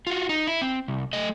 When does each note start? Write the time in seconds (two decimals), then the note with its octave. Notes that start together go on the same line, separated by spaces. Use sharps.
0.07 F4 F#4
0.29 D#4
0.47 E4
0.61 C4
0.88 C2
1.13 A3 D#5